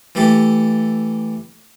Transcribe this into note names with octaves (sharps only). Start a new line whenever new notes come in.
E3 A3 G4 A4